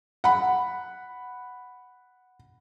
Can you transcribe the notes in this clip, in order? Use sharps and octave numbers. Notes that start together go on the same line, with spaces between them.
F#5 B5